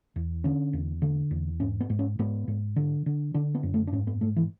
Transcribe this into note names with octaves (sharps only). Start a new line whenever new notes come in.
E2
D3 C#4
E2
D3
E2
G#2 C#4
B3
G#2
C#4
G#2 B3
G#2
D3
D3
D3 D4
B3
F#2
A3
D4
G#2 C#4
B3
G#2 A3
E3